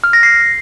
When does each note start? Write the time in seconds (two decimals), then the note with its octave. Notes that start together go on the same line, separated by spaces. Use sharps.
0.04 F6
0.13 A#6
0.23 C7